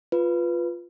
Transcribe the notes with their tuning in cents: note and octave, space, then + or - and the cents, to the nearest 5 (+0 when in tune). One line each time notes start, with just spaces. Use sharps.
F4 +0 B4 +0